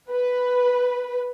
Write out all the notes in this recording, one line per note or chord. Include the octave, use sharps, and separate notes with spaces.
B4